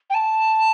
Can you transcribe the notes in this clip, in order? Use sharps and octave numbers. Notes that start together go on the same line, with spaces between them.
G5
A5